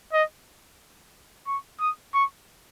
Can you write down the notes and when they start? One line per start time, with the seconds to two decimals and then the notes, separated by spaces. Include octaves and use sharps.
0.13 D#5
1.47 C#6
1.80 D#6
2.14 C#6